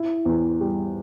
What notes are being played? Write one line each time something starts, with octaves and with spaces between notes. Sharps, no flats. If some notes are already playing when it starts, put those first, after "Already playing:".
Already playing: E4
E2
G3